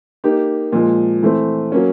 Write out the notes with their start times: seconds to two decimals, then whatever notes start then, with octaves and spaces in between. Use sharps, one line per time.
0.24 A#3 D#4 G4
0.72 A#2 F3 G#3
1.23 E3 A3 C4
1.72 F#3 A#3 C#4